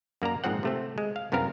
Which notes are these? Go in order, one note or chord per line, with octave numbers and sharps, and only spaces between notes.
F#2 A#3 D5 A#5
A#1 G#2 F3 C4 F#5
C3 A3 C4
G#3
F5
C2 F#2 B3 C4 A#4 F5